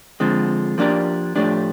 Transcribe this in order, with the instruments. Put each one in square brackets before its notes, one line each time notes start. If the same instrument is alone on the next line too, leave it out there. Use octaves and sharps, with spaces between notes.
[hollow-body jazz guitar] D3 F3 G#3 C4
F3 A#3 D4 G4 A#4
A2 F3 A3 D4 G4